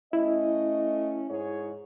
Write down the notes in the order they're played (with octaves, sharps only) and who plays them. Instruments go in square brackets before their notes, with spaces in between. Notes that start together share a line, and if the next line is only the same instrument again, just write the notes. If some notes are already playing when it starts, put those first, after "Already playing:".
[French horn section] A3 C#4 D#5 [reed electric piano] E4
[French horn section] G#2 G#4 C#5